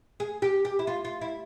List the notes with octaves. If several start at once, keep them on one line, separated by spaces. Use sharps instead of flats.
G#4
G4
G4
E4
F4
F4
E4